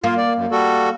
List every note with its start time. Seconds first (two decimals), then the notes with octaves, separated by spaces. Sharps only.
0.04 A#3 F4
0.18 D5
0.35 F#2
0.51 G3 F#4 A4